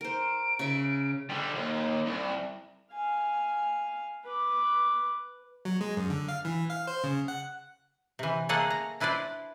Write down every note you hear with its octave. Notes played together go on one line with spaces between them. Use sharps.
A#4 C5 D7
C#3 E5
D3 G3
D#2
C2
F5 G#5
B4 D6
F#3
G#3
F#2
D3
F5
E3
F5
C5
C#3
F#5
C3 E3
A3 A#3 G#4 A4 F#5
A#5
D4 E4 B4 C5 D5